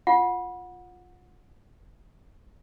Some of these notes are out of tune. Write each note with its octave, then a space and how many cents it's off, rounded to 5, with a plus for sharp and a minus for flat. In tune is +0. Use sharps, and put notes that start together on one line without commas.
F4 +0 F#5 -25